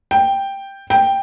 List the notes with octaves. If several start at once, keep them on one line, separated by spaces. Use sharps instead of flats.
G5
G5